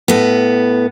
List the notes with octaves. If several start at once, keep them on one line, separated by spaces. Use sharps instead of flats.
A2 B3